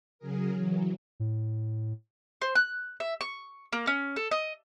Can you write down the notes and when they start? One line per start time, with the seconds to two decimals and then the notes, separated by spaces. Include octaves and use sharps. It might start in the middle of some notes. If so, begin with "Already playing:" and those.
0.19 C#3 F#3 G#4 A#4
0.54 E3 F#3
1.20 A2
2.41 C5
2.55 F#6
3.00 E5
3.21 C#6
3.73 A#3
3.87 C#4
4.16 A4
4.31 D#5